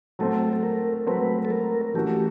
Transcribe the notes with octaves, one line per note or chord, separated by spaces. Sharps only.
F#3 A3 C4 A4
A4
A#4
F#3 A3 C4 B4
A4
A#4
E3 A3 C#4 F#4 G4